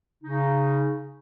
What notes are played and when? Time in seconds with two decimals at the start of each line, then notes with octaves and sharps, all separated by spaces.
0.23 C#3 D#4